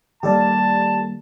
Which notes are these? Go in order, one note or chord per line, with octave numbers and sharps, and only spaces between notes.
D#3 G3 A#3 G4 A4 D5 A5